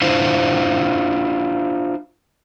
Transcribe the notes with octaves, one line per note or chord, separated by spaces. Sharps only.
D4 E4 F4 C5